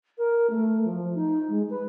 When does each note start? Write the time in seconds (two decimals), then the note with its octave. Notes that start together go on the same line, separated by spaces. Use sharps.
0.18 A#4
0.50 A3
0.84 F3
1.15 D#4
1.49 G#3
1.70 B4